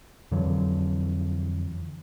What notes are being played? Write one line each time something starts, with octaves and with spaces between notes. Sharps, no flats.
F2 D3 E3 F#3